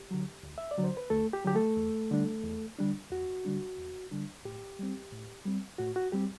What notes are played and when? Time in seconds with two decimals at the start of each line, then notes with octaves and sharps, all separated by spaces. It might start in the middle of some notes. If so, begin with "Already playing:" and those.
Already playing: G4
0.11 D3 F#3
0.43 D2
0.58 E5
0.71 D5
0.78 D3 F#3
0.84 C5
0.97 B4
1.10 D2 A3 A4
1.33 G4
1.45 D3 F#3 G4
1.55 A3 A4
1.77 E2
2.11 D3 G3 D4
2.44 E2
2.78 D3 G3 D4
3.11 E2 F#4
3.45 D3 G3 D4
3.79 E2
4.11 D3 G3 D4
4.45 A2 G4
4.79 G3 C4
5.13 A2
5.45 G3 C4
5.78 A2 F#4
5.96 F#4
6.12 G3 C4 G4